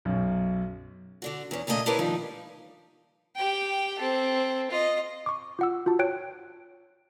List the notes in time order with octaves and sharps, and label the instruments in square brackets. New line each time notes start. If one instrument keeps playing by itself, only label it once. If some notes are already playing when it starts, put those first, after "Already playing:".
[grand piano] B1 F#2
[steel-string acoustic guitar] D3 D4 F#4
E2 C#4
A#2 C#3 A3 F#4 D#5 E5
D4 E4 G4 A#4 B4 C#5
D#3 F3 G3 D4 D#4
[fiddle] G4 G5
C4 A4
F4 D#5
[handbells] C#6 D6
F4 F#5 E6
F4 F#4 A5
C#5 G5 F#6 D7